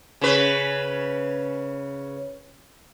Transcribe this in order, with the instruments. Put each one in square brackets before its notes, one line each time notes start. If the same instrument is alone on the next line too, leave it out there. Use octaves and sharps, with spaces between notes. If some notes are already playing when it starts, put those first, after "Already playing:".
[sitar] C#3 B4